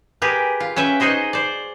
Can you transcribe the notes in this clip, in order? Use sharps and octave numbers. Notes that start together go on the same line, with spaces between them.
G4 G#4 A#4 B4
F4
C#4 B4 E5 G5
D#4 F#4 G#4 C5 D#5
C5 D5